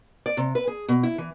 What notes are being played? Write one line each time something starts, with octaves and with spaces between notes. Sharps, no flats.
D5
C3
B4
G#4
B2
E4
E3